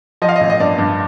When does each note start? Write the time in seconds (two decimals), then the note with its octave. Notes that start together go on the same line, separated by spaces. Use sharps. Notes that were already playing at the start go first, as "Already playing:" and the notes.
0.22 F3 D#5
0.29 F5
0.36 D#5
0.41 A1
0.50 D#5
0.60 G2 D5
0.78 G2